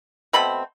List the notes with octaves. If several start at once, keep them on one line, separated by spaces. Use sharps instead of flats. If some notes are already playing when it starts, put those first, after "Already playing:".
B2 A3 C4 B5